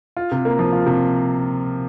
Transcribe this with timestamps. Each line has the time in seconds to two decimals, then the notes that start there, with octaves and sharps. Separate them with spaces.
0.17 F4
0.32 C3
0.45 A#3
0.59 F3
0.73 F4
0.86 C3